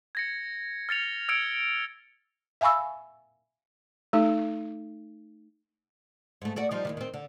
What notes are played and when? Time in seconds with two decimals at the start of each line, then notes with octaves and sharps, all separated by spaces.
0.15 G#6 A#6 C#7
0.89 F6 A6 C#7 F7
1.29 E6 F6 G#6 C#7 D7 F7
2.61 E5 F5 G#5 B5 C#6 E6
4.13 A3 D#4 A4
6.42 G#2 A3
6.56 A3 F#4 D5
6.71 F3 G3 D#4
6.85 D#2 C3 D#3
6.97 D#3 C4
7.14 D3